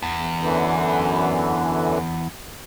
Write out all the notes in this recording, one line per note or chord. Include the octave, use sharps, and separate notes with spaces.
E2
F#2 D3 E3